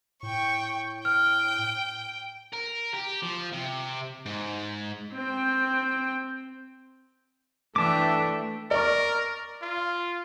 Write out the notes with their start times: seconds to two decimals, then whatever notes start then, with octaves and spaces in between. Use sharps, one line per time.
0.23 A2 G5 C#6
1.05 G5 F6
2.54 A#4
2.94 G4
3.23 F3
3.53 C3
4.26 G#2
5.13 C4 G5
7.76 E3 A3 D4 E5 G5 A5 D6
8.71 A#4 D5 C#6
9.62 F4